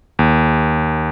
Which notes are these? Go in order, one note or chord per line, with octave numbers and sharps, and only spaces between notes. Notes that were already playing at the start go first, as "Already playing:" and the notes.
D#2